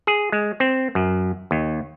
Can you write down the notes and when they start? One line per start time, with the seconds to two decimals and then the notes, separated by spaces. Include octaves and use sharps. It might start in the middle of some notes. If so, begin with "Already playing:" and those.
0.07 G#4
0.32 G#3
0.60 C4
0.95 F#2
1.51 D#2